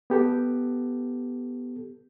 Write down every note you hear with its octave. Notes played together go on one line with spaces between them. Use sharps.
B3 G4 A4